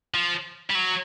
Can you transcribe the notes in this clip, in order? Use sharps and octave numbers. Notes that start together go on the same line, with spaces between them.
F3
G3
F#3